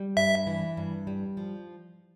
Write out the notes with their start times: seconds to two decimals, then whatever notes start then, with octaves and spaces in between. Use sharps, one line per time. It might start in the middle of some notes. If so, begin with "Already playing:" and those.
Already playing: G3
0.17 G2 E5
0.47 E3
0.77 G2
1.07 G3
1.37 F3